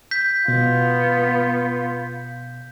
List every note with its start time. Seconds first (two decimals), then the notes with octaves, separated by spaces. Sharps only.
0.11 G6 B6
0.48 B2 B3 F4